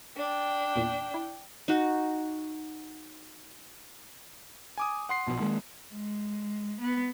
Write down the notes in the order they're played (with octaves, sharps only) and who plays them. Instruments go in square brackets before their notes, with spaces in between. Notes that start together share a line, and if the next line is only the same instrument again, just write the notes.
[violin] D4 G5
[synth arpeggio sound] E2 A#2
E4
[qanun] D#4 F#4
[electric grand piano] G#5 D6 D#6
F#5 C6 C7
[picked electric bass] A#1 B2
D#3 G#3 A#3
[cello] G#3
B3